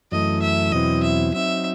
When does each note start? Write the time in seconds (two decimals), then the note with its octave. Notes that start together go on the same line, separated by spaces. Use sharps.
0.11 F#2 E3 A3 D#5
0.42 E5
0.72 E2 B2 F#3 C4 E4 D#5
1.03 E5
1.33 F#3 C4 D#4 E5